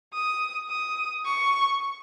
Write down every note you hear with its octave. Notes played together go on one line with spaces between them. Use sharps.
D#6
D#6
C#6